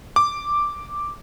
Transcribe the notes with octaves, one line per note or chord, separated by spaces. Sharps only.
D6